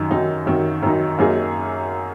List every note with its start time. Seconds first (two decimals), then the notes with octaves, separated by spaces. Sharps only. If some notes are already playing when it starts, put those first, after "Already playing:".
Already playing: F#2 D#3 F#3 D#4
0.11 F#2 D#3 F#3 D#4
0.46 F#2 D#3 F#3 D#4
0.83 F#2 D#3 F#3 D#4
1.19 F#2 F#3 A#3 D#4 G#4